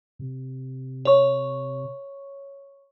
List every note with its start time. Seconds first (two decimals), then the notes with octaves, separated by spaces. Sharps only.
0.19 C3
1.05 C#5 C#6